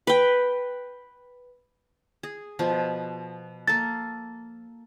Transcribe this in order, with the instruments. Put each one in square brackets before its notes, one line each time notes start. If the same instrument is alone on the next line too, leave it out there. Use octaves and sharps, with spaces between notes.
[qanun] B4 G5
G#4
B2 F3
[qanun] A#3 A4 [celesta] A6